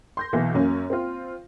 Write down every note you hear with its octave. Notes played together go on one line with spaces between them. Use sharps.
C6 G6 A#6
B1 E3
F#2 A#3 C#4
C4 F4